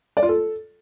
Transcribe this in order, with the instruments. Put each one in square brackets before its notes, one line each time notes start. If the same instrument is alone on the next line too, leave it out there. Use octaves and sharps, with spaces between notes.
[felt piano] D5
F4
A4